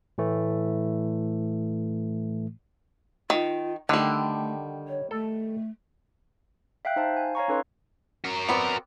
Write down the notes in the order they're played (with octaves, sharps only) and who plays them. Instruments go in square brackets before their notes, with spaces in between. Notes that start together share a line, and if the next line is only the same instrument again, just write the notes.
[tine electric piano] A2 E3 A3
[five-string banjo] D#3 [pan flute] F4
[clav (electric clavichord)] D3 [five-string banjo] D#3 G3 [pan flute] A3
[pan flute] C#5
[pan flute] A3 [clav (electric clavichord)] A4
[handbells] E5 F5 G5 F#6
D#4 C5 F5 A5
G#5
C#5 F5 A#5 C#6
C#4 D#4 A4 B4 C#5 C6
[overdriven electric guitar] F#4 A#4
[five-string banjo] B3 C4 D5 [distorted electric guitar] A#5